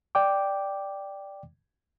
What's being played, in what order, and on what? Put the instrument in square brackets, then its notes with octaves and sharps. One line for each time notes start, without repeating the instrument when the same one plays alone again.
[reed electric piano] D5 G5 D6